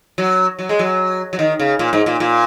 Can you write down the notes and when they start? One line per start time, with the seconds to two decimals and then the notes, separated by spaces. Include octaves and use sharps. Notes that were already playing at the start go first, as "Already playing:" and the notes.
0.18 F#3
0.59 F#3
0.69 G#3
0.79 F#3
1.33 F#3
1.39 D#3
1.60 C#3
1.79 A#2
1.93 G#2
2.06 A#2
2.20 A#2